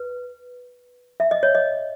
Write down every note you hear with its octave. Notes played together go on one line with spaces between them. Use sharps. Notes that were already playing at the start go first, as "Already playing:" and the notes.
Already playing: B4
E5
D#5
C#5
D#5